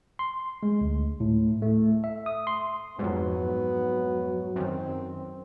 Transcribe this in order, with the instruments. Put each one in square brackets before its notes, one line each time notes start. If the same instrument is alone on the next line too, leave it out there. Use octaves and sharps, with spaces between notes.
[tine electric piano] C6
G#3
D2
A2
A3
E5
D#6
C6
[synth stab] F2 G#2 [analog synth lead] F#3 [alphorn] B3
[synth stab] F#2 D#3 [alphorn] C4